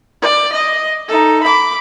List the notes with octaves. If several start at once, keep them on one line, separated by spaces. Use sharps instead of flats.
D5
D#5
D#4 A4
B5 D6